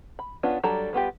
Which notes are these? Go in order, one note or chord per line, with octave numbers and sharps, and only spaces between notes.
B5
B3 C#4 D4 F4
F#3 G3 D4 A4 A#5
G3 B3 F4 G4